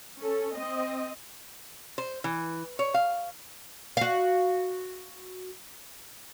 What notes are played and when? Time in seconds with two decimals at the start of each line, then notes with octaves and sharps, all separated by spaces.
0.21 C#4 A4
0.56 C4 D#5
1.98 C5
2.24 E3
2.79 C#5
2.94 F5
3.97 F#4 F5